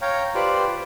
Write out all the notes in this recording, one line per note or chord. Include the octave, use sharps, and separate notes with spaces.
C#5 F5 G5 A#5
F4 G4 B4 C5 D5